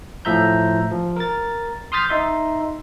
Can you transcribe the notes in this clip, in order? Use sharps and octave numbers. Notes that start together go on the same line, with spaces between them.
A2 F3 E5 A#5 G6
F3
A#4 A6
C6 D#6 F6 G6 A6 B6
D#4 E5 C6